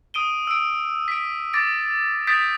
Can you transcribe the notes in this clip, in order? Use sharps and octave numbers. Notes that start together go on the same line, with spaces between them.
D#6 D7 D#7 G7
E6 D7
B6 D7
D6 A6 A#6 D7
D#6 G6 A6 B6 D7